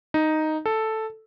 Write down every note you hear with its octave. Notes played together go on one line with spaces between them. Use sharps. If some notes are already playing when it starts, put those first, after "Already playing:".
D#4
A4